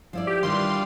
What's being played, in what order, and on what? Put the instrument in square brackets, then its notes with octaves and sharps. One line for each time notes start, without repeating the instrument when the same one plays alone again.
[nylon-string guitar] F3 E4 D5
[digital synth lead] G4
[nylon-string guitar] D#3 E3 D4 [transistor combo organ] G3 F4 [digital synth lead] C6